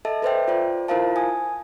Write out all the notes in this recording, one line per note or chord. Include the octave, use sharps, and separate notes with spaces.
A4 D#5 E5 A5
A4 B4 C5 D5 E5 G5
F4 C5 D5
E4 F4 A#4 C5 F5 A5
G#5 D#6